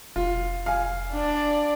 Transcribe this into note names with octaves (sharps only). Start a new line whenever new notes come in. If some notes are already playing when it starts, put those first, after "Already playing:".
F1 F4
F5 G#5
D4 D5